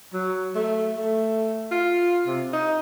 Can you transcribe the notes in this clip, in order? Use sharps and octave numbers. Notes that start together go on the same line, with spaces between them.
F#3
A3
A3
F4
C3
D#4